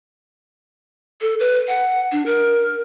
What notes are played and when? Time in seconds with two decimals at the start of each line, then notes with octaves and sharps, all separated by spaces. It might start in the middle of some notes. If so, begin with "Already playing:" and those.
1.21 A4
1.40 B4
1.68 F#5
2.12 D4
2.26 A#4